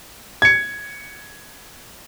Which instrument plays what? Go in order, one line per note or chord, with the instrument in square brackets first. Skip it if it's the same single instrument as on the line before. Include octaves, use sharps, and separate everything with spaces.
[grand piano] G#6 C#7